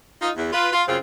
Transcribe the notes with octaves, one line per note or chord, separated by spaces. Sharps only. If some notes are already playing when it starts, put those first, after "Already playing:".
D#4 F4
E2
F4 B4
F4
F#2 C#3 C4 F4